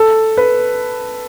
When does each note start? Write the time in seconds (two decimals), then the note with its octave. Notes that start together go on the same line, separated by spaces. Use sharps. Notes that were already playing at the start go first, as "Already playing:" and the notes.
Already playing: A4
0.37 B4